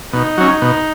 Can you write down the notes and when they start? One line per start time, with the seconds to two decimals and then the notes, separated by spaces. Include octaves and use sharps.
0.13 B2 D#4
0.37 F#3 C#4
0.62 B2